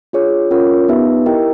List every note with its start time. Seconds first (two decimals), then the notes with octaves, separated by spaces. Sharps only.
0.13 D4 F4 G#4 C#5
0.51 C#4 F4 A#4 C#5 F#5
0.88 B3 D#4 G4 B4 E5
1.26 E4 G4 A#4 D#5 G5